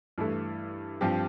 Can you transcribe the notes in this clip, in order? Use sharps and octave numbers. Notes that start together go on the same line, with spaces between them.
G2 E3 A3 E4 A4
G2 F3 C4 G4